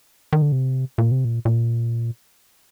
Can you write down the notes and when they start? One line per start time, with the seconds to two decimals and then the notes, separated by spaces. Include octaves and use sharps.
0.33 D#3
0.42 D3
0.52 C3
0.98 A#2
1.11 C3
1.25 A#2
1.45 A#2